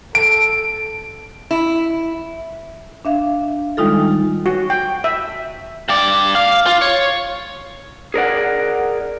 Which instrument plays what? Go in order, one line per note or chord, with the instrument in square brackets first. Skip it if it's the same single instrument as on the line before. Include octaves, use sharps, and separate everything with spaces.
[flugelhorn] A4 [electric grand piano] D7
[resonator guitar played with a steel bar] E4
[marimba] D4 E5 F5
D#3 G3 G#3 D#4 F4 A4
[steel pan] F#4
G5
E5
[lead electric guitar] G2 D5
F5
F4
C#5
[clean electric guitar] G#4 A#4 D5 F#5